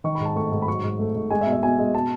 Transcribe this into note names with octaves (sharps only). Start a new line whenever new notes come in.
D#3 C#6
G#2 B5
A5
A3 C#6
G#2
B5
F#3 C#6
G#2
A3
G#2
G#3 G#5
E5
B2
E5
B2 G#5
G#3
B2 A5